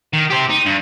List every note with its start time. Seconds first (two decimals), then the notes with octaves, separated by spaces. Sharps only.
0.13 D#3
0.30 G4 C5
0.50 D#4
0.66 G2